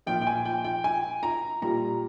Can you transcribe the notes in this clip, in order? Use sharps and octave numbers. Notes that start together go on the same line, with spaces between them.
A#2 F3 G5
G5
G#5
G5
G5
G#5
A#5
A#2 G3 A#5